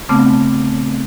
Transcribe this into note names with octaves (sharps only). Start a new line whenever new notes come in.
C#3 A3 B3 C4 A5 D6